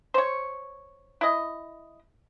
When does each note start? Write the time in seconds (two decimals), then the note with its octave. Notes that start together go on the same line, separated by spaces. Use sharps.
0.14 C5 C#5
1.21 E4 D#5